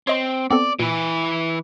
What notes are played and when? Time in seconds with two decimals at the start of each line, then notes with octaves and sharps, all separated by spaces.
0.07 C4 C#5 D#5 C6
0.51 B3 C4 A4 D5
0.79 A#2 E3 B4